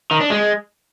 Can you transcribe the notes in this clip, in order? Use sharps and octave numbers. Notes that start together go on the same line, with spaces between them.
D#3
D4
G#3